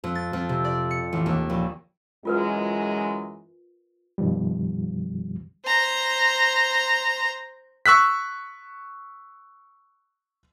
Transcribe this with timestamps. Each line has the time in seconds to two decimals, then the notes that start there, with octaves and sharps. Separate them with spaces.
0.04 F2
0.15 A6
0.33 F2
0.49 C3
0.64 D5
0.91 C#7
1.13 A1
1.26 D#2
1.50 A#1
2.25 F#2 E3 G#3 F4 A#4 B4
4.18 F#2 B2 D#3 F3 G3
5.65 C5 A#5
7.86 C#6 E6 F#6 B6